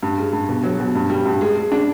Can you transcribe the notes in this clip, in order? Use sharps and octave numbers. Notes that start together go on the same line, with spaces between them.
G2
G#3
G2
B2
F#3
B2
G2
G3
G2
G#3
G#3
D4